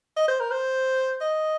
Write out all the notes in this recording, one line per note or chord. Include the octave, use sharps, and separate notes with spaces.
D#5
C5
A#4
C5
D#5